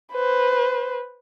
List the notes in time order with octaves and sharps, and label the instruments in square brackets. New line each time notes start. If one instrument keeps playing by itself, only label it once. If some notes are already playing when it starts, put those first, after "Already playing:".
[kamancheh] B4 C5